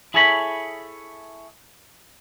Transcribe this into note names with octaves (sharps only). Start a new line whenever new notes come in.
E4 G#4 A4 C#5 A5 B5